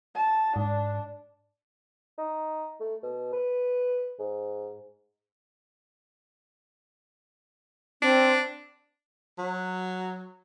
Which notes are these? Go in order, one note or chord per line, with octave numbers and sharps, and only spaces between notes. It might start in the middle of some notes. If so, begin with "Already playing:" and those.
A5
G#2 D4
D#4
A3
B2
B4
G#2
C4 D4
F#3